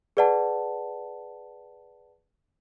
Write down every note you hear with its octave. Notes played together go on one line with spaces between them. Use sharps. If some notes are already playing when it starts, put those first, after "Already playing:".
G#4 B4 D5 F#5 A5